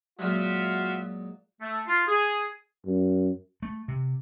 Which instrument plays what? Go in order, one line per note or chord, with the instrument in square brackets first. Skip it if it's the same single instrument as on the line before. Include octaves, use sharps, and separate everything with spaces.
[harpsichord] A#2 F#3 G#3 [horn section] F4 F#4 E5
[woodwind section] A3
F4
G#4
[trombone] F#2
[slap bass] A3
C3